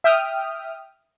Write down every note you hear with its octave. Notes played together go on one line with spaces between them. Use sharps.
E5 G5 D#6 F6